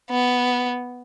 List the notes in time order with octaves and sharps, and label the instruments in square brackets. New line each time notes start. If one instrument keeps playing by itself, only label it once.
[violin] B3